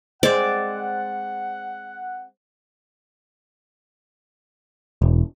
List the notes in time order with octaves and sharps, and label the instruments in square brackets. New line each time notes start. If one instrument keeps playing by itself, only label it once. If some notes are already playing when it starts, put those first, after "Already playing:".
[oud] G#3 C4 [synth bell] C5 [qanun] D5 [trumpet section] F#5
[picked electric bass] E1